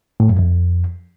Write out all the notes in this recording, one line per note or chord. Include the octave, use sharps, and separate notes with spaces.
A2
F#2
F2